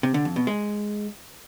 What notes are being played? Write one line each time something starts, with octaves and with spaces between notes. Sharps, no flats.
C3
D3
F2
B2
G#3